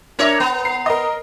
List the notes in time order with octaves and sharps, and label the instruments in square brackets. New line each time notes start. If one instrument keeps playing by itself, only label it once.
[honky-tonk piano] D4 E5 D6 [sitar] A#4 C#5
[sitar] B3 [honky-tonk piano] A#5
[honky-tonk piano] A#5 C7
A#4 D#5